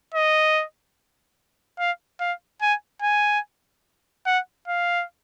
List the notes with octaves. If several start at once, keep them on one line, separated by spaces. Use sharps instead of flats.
D#5
F5
F5
G#5
G#5
F#5
F5